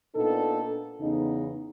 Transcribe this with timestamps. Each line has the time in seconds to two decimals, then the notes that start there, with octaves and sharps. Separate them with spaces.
0.16 A#2 B3 D4 D#4 A4
1.01 E2 C#3 B3 D#4